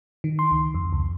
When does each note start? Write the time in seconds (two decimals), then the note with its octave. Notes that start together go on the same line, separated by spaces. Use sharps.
0.24 D#3
0.39 C6
0.51 C#2
0.74 F2
0.93 C#2